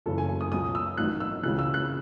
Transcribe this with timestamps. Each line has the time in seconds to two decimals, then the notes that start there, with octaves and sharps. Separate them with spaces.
0.06 F#1 F#2 C#3 E3 A4
0.18 G#5
0.29 G#5
0.41 D#6
0.52 C#2 B2 F#3 D#6
0.75 E6
0.98 A1 G#2 D#3 F#3 F#6
1.20 E6
1.43 C#2 C#3 E3 F#6
1.59 E6
1.74 F#6